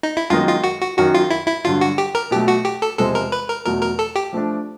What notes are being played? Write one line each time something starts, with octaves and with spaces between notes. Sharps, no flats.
D#4
E4
F#2 D#3 G#3 B3 D#4 F4
F4
F#4
F#4
F#2 D#3 F#3 F#4
F4
E4
E4
G2 D3 F#3 F4
F#4
G4
A#4
B2 F#3 A3 G4
F#4
G4
A4
E2 C3 F3 G#3 C4 A4
A#4
B4
A#4
E2 B2 F#3 A3 A#4
A#4
A4
G4
F3 A3 D4